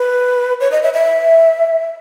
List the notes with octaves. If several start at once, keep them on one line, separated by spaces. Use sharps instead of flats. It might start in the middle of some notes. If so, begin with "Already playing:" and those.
Already playing: B4
C#5
D#5
E5
E5